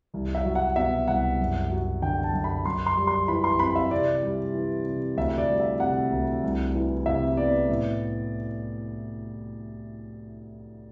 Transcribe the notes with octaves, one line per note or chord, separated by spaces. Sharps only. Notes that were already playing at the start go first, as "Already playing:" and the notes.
C2
E5
F#3
F#5
B2 E5
C2 F#5
F#2
F#3
D3 G5
A5
F#2
B5
F#2 C6
C6
G3
C6
E3 B5
C6
C4 B5
E5
C3 D5
G3
E3
C3
D2 E5
D5
G3
E5
C3 F#5
D2
C2
E3
C3 E5
B3 D5
A2